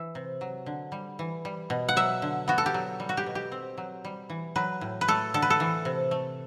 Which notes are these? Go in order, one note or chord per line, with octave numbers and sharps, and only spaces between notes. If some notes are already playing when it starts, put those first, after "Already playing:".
Already playing: E3 E5
C3
F#3
D3
G3
E3
G3
B2
F#5
F#3 E5
D3
B3 F#4
A4
G4
F#3
G3
F#4
G4
B2
G4
C4
F#3
G3
E3
F#3 B4
A2
B4
A3 A4
D3 A4
B4
A4
E3
C3
A3